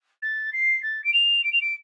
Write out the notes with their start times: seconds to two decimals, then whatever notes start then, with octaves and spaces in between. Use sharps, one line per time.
0.22 A6
0.53 C7
0.82 A6
1.04 D7
1.13 F7
1.44 D7
1.52 F7
1.61 D7